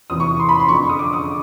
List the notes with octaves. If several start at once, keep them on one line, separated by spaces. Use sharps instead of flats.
E2 C3 E3 D#6
C#6
C6
B5
C6
F2 D3 F3 C#6
D#6
D6
D#6